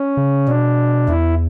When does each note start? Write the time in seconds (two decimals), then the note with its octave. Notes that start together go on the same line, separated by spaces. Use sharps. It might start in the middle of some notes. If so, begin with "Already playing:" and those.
Already playing: C#4
0.17 C#3
0.48 B2 D4
1.08 E2 E4